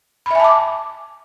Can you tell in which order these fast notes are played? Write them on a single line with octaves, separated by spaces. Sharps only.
B5 E5 G#5 A5 D6